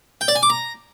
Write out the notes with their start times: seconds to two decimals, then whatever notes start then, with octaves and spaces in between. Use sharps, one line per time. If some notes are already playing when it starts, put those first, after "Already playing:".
0.21 G5
0.28 D5
0.35 G#5
0.43 D6
0.50 A#5